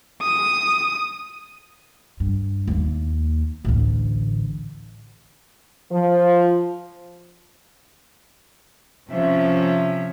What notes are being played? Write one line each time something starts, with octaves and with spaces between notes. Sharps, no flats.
D#6
G2
D#2 A#3
A1 D2
F3
C3 F3 C#4 E5